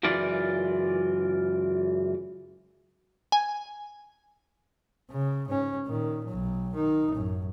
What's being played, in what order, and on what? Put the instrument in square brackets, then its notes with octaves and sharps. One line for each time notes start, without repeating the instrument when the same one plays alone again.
[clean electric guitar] C#2 F#2 E3 F4 D5
[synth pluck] G#5
[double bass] C#3
G#2 C#4
A#2 D#3
B1 F#3
D#3 D#4
A1 F#2